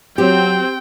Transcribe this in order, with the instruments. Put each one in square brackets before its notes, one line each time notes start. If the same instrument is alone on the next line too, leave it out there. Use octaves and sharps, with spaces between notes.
[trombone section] F#3 [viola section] C4 [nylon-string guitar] G4 [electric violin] G5